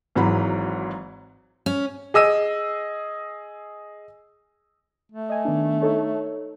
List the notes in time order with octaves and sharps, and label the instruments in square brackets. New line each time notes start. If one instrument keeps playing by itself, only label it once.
[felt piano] G#1 G#2 E3 F#3 B5
[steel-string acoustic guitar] C#4
[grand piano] G#4 D#5 E6 D#7
[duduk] A3
[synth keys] D#5 G#5
D#3 B3 D4
D#4 A4 C#5